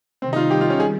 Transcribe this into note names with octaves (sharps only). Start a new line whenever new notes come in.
C3 D#3 G3 C4
D#4
F4
G4
F4
C#4
G#4